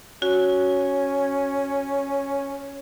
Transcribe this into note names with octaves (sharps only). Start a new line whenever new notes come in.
C#4 F#4